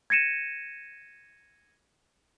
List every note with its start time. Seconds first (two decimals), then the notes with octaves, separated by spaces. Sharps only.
0.10 G#6 A#6 C#7 D#7 E7